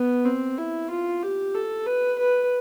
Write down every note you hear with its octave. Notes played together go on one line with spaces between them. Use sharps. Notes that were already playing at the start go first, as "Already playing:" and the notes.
Already playing: B3
C4
E4
F4
G4
A4
B4
B4